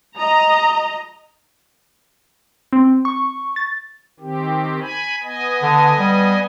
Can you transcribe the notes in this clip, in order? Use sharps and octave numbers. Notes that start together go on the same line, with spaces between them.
D#5 A#5
C4
C#6
A6
D#3 C4 G4
G#5 B5
B3 D#5 G#5
D3
G3